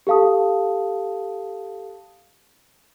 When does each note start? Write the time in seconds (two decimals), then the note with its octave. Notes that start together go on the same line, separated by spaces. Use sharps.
0.07 G4 A4 F5 A5 D#6